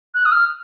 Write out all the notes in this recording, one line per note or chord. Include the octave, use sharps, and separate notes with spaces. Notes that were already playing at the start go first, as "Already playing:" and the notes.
F#6
D#6
F6